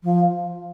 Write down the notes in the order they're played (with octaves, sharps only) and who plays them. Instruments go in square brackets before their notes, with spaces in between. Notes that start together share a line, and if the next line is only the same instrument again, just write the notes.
[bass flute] F3